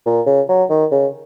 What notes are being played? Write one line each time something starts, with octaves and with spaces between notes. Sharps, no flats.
A#2
C#3
F#3
D#3
C#3